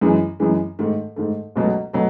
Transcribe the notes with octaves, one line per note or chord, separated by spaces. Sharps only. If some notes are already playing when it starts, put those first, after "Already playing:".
F#2 E3 G#3
F#2 E3 G#3
G#2 D#3 A3
G#2 D#3 A3
C#2 B2 F#3 A3
B2 F#3 A3